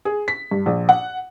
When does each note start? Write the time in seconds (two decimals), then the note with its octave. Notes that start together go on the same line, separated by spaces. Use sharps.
0.05 G#4
0.28 B6
0.51 G2
0.66 A#1
0.89 F#5